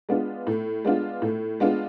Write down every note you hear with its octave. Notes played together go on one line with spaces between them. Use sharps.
G#3 B3 D4 F4
A2
G#3 B3 D4 F4
A2
G#3 B3 D4 F4